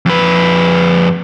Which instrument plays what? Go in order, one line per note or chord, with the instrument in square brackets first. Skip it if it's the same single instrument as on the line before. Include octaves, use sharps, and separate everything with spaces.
[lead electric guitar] F2 B4